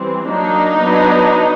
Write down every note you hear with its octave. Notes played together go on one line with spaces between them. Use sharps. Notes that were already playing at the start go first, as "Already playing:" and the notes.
Already playing: E3 G3 C4
F#3 A#3 D4 D#4
F#3 B3 D4